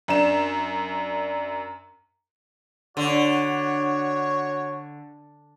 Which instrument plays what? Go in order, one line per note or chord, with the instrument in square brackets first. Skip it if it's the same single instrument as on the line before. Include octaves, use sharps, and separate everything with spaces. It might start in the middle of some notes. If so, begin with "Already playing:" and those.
[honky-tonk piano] F#2 D4 E7
[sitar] D3 [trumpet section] F#4 C#5